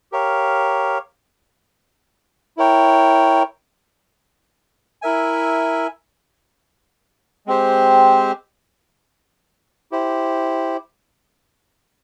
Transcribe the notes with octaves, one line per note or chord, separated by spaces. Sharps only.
G4 A#4 C#5 F5
E4 A#4 C#5 G5
E4 A#4 E5 G#5
G#3 C4 G4 C5
E4 G4 C5